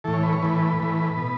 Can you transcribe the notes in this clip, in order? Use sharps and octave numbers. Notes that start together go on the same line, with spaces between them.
A2 E3 A4
C#5
B4
C#5
A2 E3 B4
A2 E3
B2